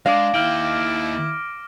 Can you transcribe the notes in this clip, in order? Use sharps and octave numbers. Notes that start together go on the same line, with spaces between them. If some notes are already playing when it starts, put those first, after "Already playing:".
G#3 D4 F5 D6 A#6
D#2 E4 G5 F6 D7